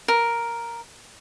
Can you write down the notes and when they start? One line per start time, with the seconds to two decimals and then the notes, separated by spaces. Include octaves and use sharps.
0.08 A#4